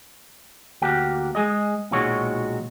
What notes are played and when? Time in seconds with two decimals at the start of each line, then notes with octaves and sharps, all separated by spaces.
0.82 D2 A#3 F#4 G4
1.35 G#3 G#4 D#5
1.91 B1 A#2 D#3 G#3 F#4 C#5